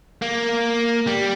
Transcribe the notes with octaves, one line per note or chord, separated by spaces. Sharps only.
A#3
G3